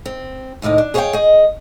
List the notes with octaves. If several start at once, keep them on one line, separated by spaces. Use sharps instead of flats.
C4
D#2 A2 C3 D#4 D#5
D4
G#4 C5 C#5 D#5 F5 G5
G#4 D#5